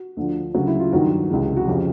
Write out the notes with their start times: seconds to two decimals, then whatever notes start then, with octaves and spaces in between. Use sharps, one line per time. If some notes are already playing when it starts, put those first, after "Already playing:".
Already playing: F#4
0.17 D2 D3 F3
0.55 D2 C#3 F#3 F#4
0.67 E4
0.80 F4
0.92 G2 D#3 F#3 F#4
1.30 C#2 C3 E3 G#3
1.57 F#4
1.68 F2 C#3 F3 G4